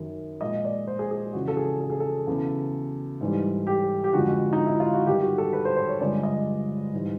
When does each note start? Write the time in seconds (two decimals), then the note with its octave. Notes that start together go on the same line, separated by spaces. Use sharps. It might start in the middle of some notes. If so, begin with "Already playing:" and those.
Already playing: F#2 D#3 F#3
0.41 A#2 F3 G#3 D#5
0.65 D5
0.87 C5
0.99 G#4
1.11 G#4
1.33 F2 C#3 E3 F#4
1.48 A4
1.57 G#4
1.81 A4
1.90 G#4
2.00 A4
2.27 E2 C#3 F#3
3.21 G#2 E3 G3
3.67 G4
4.04 G4
4.13 F2 D3 F3 G#3 F#4
4.53 D#4
4.66 E4
4.80 F4
4.94 F#4
5.07 G2 D#3 F#3 G4
5.22 F#4
5.38 A4
5.53 B4
5.65 C5
5.76 C5
5.88 C#5
6.00 G2 D3 F3 G#3 D5
6.23 D#5
6.94 G#2 E3 G3